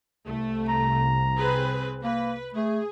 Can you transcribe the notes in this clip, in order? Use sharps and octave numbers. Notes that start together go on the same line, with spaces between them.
C2 A3
A#5
C4 G#4 B4
A#3 B4
A3 G#4